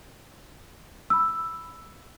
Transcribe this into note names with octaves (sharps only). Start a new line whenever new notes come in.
B5 E6